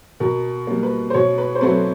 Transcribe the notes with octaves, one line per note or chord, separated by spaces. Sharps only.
B2 A#4
G3 A#3
B4
C5
B2 C#5
B4
C5
F#3 A3 C4 B4